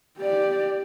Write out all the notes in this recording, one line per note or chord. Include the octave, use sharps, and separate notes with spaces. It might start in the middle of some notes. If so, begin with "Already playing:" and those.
G4 D5